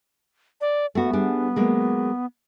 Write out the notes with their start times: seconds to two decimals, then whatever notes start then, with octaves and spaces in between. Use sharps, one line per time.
0.61 D5
0.95 A3 B3 F#4
1.13 G3 D4 G#4
1.56 F#3 G#3 A#3